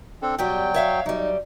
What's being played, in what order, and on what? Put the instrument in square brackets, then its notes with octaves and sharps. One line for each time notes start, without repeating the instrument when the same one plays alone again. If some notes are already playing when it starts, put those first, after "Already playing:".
[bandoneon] C4 D4 A4
[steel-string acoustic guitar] B2 G3 G4 [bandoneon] F#3 G5
[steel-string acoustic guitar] C#5 E5 F5
[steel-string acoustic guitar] F#3 G3 [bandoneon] D#4